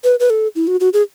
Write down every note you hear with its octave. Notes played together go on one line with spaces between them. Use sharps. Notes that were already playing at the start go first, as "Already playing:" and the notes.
B4
B4
A4
E4
F#4
F#4
G#4